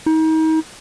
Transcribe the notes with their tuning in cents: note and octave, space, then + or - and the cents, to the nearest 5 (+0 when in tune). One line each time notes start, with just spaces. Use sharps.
D#4 +35